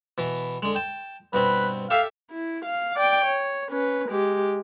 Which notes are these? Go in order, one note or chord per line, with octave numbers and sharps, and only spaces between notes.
B2 E3
D3 G#3
G5 A5
G2 B2 C4 B4
G4 A4 E5 F5
E4
F5
D5 G5
C#5
C#4 B4
G#3 G4